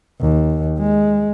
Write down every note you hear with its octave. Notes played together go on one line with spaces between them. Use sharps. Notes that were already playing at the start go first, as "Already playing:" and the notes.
D#2
G#3